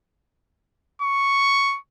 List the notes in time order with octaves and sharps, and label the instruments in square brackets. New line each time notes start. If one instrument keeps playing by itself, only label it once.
[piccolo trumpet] C#6